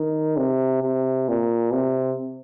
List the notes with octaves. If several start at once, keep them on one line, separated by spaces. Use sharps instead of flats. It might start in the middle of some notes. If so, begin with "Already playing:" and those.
Already playing: D#3
C3
C3
A#2
C3